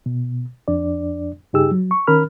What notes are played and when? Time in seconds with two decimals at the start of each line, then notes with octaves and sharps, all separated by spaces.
0.06 B2
0.68 F2 D4 D5
1.53 G2 C#3 D#4 G4 G#4 E6
1.72 F#3
1.91 C#6
2.07 D#3 C#4 A#4 B5 F6